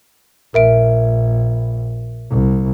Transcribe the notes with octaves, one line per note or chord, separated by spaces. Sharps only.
A#1 A#4 E5 D7
C2